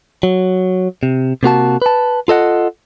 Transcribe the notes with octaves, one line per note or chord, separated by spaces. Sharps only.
F#3
C3
C3 A#3 F#4 A5
B4 A5
F4 A4 D#5 F#5